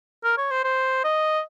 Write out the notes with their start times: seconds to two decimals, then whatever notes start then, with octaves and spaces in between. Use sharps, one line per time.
0.24 A#4
0.38 C#5
0.51 C5
0.64 C5
1.04 D#5